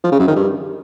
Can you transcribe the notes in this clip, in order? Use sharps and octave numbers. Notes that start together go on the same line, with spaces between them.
F3
C#3
F#2
D#3
G2